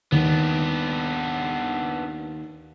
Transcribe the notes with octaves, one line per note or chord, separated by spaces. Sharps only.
D#2 B3 D4